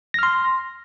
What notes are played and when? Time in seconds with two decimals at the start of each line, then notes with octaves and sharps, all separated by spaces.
0.14 A#6
0.19 F6
0.23 C6